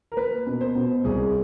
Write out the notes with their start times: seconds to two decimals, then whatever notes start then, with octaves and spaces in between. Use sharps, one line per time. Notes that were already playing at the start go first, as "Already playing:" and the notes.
0.12 A#4
0.17 A#3 B4
0.47 B2
0.61 C5
0.75 B2
1.04 C2 G#4